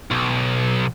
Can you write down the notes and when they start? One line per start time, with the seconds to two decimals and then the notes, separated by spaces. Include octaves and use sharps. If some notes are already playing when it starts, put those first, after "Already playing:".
0.11 B1